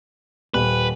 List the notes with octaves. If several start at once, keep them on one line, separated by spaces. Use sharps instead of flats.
D#1 B4